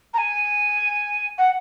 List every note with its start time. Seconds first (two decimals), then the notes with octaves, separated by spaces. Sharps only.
0.13 A#5
0.17 G#5
1.38 F#5